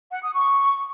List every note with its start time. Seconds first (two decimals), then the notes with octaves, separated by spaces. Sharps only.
0.12 F#5
0.23 D#6
0.34 C#6